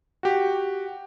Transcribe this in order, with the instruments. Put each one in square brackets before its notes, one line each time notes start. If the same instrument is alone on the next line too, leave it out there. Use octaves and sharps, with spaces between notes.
[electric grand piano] F#4 G4